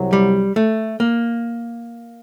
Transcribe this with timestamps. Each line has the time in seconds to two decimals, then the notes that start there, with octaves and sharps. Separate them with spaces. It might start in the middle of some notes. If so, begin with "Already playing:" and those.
Already playing: C2 C3 F#3
0.13 G3
0.56 A3
1.00 A#3